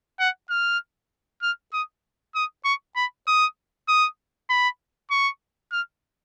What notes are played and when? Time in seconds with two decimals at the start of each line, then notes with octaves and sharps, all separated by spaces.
0.20 F#5
0.50 F6
1.42 F6
1.73 D#6
2.35 D#6
2.65 C#6
2.96 B5
3.27 D#6
3.88 D#6
4.50 B5
5.10 C#6
5.72 F6